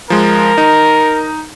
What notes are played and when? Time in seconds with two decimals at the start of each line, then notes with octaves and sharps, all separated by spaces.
0.10 F3 G#3 A#4
0.58 D#4